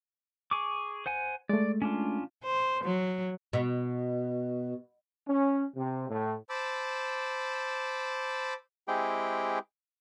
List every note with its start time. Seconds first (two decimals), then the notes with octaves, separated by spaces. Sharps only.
0.51 G#4 C#6 D6
1.06 C5 F#5 G#5
1.49 G#3 A3 D5
1.82 C#4 D4 F4
2.44 C5
2.84 F#3
3.53 B2
5.27 C#4
5.76 C3
6.09 A2
6.50 C5 A5 B5 D6 E6
8.88 G#3 C4 E4 G4 G#4 G5